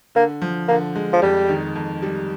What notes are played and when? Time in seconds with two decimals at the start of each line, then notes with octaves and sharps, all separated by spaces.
0.15 D3 A#3
0.42 F3
0.68 D3 A#3
0.96 G#3
1.13 F3
1.22 F2 G3
1.49 D#3
1.76 F2
2.02 G3